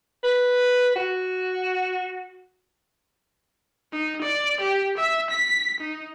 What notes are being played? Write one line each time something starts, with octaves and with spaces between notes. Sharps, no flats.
B4
F#4
D#4
D5
G4
E5
B6
D#4